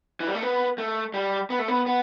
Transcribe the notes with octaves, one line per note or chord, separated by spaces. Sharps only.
E3
G3
A3
B3
A3
G3
B3
A3
B3
B3